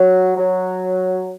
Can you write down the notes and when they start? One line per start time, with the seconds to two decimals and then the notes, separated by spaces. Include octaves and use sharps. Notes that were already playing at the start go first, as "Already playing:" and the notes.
Already playing: F#3
0.37 F#3